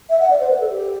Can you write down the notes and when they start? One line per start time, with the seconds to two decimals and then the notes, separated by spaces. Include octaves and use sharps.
0.10 E5
0.20 F#5
0.30 D5
0.40 C5
0.50 B4
0.60 A4
0.70 G4